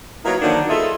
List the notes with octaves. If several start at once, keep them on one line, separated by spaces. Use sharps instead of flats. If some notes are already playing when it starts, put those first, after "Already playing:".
F#3 A#3 B3 D#4 E4 B4
D3 D#3 F3 F#3 A#3 D4
E4 F4 G#4 A4 D#5 E5